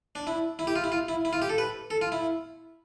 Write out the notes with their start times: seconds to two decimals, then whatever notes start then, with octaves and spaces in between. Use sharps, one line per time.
0.15 D4
0.27 E4
0.59 E4
0.67 G4
0.76 F4
0.84 E4
0.92 F4
1.08 E4
1.25 E4
1.33 F4
1.42 G4
1.49 A4
1.58 B4
1.90 A4
2.01 F4
2.12 E4